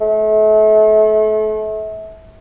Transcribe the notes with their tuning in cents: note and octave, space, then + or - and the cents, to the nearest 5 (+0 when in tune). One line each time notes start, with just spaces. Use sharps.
A3 -35